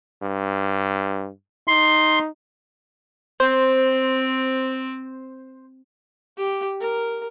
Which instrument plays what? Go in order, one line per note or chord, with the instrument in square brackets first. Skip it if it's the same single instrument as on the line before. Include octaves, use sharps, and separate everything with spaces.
[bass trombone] G2
[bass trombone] D#4 [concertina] C6
[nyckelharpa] C4 [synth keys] C5
[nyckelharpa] G4
A#4